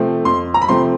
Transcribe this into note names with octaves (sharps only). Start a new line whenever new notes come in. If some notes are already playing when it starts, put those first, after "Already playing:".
Already playing: C3 F3 A3 C4
F2 C6
A#5
B5
C3 F3 A3 C4 C6